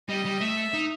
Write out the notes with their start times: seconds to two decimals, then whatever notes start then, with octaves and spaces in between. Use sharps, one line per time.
0.09 G3 D#5
0.25 G3
0.41 A3 E5
0.74 D#4